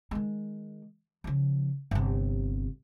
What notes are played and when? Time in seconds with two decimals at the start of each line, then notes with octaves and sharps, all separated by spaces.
0.11 D#3 G#3
1.24 C#3 F3
1.91 G1 C3